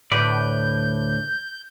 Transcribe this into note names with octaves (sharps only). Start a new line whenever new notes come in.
D2 A2 B4 D5 G6